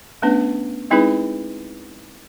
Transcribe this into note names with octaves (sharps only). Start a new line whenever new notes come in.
A3 B3 C#4 D4 B4
G#3 C4 D#4 E4 G#4 B4